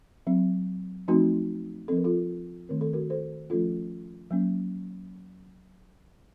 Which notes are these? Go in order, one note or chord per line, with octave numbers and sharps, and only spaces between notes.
F#3 C4
F3 A3 C4 D#4 F#4
F3 C4 A4
A#4
F4 A4
D#3 A3 C4 A#4
A4
F#4 A#4
A4 C5
F3 A3 C#4 F4 A4
F#3 A#3 C#4